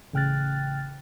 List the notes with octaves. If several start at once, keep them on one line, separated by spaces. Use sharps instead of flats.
A1 C#3 G5 F6 F#6 A6